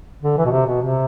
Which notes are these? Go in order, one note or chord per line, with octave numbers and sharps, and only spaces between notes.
D3
E3
B2
C3
B2
C3